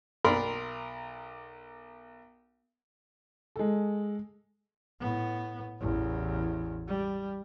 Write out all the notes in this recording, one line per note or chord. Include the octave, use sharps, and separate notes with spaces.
B1 A#4 D5 B5 C6
G#3 A4
A2 B3
A1 E2
G3